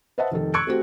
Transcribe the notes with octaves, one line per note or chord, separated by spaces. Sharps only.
B4 C5 D#5 E5 F#5 A5
F1 D#3 A4
C#6 E6 F#6 G#6 C#7 D7
A3 C4 F#4 G4